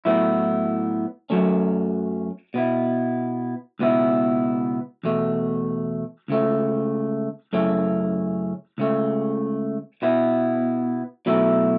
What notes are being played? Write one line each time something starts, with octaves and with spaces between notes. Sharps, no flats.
A2 F#3 B3 E4
F#2 F#3 A3 C#4
B2 B3 E4
C#2 B2 B3 E4
E2 B2 A3
C#2 C#3 A3
F#2 C#3 A3 C#4 E4
C#2 C#3 A3
B2 B3 E4
B2 F#3 A3 E4